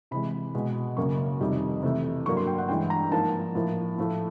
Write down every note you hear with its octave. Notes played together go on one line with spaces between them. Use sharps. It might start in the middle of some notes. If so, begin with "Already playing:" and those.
C3 E3 G#3 B5
B2 G#3
F#2 C#3 F#3 A#3 C#6
F2 C3 D#3 G3
C3 E3 A3
G2 D3 F#3 A#3 C#6
C6
G5
F#5
G2 E3 G#3 G5
A#5
G#2 F3 A#3 A5
A2 F3 A#3
A2 F3 A3